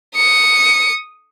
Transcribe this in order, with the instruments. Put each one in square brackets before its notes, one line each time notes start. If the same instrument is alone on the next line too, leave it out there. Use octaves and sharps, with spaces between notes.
[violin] D#6 C#7